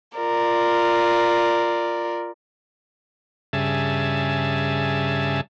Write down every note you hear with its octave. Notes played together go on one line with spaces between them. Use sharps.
F4 A#4 D5
G2 C#3 G#4 E5 A5